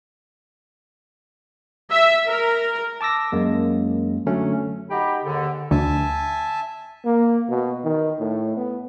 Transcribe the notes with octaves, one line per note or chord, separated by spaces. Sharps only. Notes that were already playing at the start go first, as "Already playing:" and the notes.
E5
A#4
A5 D6 E6 A#6
F#2 G#3 A#3
D3 F#3 A3 C#4
D#4 F#4 G4 G5 B5
D#2 G#2 D3
D2 E5 G#5 A5
A#3
B2
D#3
A2
B3